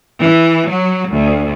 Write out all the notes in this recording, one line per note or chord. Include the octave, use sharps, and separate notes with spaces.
E3
F#3
D2